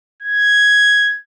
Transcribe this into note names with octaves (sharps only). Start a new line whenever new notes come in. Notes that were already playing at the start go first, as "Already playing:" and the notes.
G#6